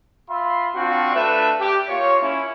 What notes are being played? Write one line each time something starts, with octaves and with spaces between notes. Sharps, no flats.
F4 E5 B5 C6
C4 D4 F4 F#4
A3 D4 B4 E5
G4
A#3 F4 C#5
C#4 E4